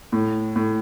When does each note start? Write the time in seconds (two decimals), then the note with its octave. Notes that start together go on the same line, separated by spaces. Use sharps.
0.12 A2
0.56 A2